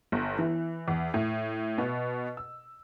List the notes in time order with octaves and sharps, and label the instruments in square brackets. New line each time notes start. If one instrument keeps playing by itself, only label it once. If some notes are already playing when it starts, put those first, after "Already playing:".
[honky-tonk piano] G1
E3
E2
A2
B2
E6